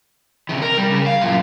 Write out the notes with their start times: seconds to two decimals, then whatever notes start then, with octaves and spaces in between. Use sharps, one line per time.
0.49 C3 D#3
0.62 A#4
0.78 G3
0.90 C#3
1.07 F5
1.21 F#2 A#2